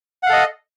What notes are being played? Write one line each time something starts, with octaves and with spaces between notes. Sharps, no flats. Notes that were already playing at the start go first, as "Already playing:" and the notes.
A4 D#5 F5 F#5